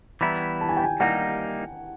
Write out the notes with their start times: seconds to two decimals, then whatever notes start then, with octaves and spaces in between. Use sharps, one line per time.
0.21 E3 G3 B3 E4 A#5
0.61 A5
0.69 G#5
0.77 G5
0.84 G#5
1.00 G3 A#3 D#4 F#5